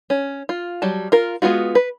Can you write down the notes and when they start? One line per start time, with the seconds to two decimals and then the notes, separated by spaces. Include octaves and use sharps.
0.10 C#4
0.49 F4
0.82 F#3 G3 A5
1.12 F4 A#4
1.42 G#3 B3 F4 F#4
1.75 B4